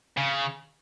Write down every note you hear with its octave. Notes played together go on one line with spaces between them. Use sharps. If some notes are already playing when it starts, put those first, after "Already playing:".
C#3